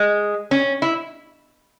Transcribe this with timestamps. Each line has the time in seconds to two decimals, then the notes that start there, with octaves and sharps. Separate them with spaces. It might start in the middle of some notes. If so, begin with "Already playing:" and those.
Already playing: G#3
0.51 C#4
0.82 E4